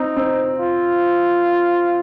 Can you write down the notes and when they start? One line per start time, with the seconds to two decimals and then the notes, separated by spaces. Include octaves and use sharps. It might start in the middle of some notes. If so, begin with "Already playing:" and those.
Already playing: C4 D#4
0.17 C4
0.59 F4